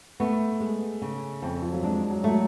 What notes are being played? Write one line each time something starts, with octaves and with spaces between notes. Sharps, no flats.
A3 B3
G#3
C#3
F2
F3
F#3
G#3 D4
F#3
F#3 A3